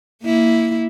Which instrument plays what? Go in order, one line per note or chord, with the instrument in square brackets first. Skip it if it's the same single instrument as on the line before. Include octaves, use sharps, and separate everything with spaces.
[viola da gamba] A#3 E4